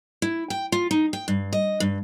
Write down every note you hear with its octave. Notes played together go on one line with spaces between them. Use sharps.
E4
G5
F4
D#4
G5
G2
D#5
G2